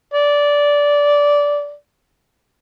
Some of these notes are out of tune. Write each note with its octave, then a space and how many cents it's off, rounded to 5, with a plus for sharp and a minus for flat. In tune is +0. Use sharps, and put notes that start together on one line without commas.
D5 -15